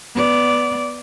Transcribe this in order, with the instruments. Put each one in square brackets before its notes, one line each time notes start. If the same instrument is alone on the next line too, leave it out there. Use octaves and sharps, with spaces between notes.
[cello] B3 D5